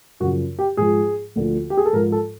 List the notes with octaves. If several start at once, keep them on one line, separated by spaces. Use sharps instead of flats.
F#2 C#3 F3 F#4
G4
G#2 F3 G#4
D2 D3 F3
G4
G#4
A4
G#2 F3 A#4
A4